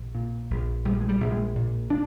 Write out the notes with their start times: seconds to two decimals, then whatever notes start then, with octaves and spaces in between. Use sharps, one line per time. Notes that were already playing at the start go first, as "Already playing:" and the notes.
Already playing: A#1
0.15 A#2
0.50 A#1
0.85 A#1 G3
1.01 G#3
1.09 G3
1.20 A#1
1.32 G#3
1.55 A#2
1.90 A#2 D4